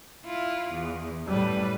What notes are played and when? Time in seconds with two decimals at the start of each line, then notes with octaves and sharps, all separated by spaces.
0.25 E4 F4
0.71 E2
1.27 F#2 A2 G3 B4